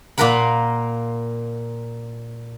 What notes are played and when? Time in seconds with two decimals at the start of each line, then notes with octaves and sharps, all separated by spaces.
0.18 A#2 A#3 F4 A#4 F#5 B5